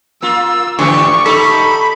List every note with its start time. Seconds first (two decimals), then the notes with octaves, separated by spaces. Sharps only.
0.22 A#3 F4 E6
0.79 G#2 D3 E3 G4 C#6
1.26 A3 D#4 G4 A4 B5